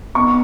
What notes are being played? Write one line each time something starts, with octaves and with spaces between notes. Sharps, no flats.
B3 C#6